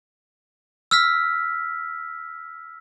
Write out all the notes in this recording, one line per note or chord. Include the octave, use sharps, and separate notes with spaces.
E6 F6 B6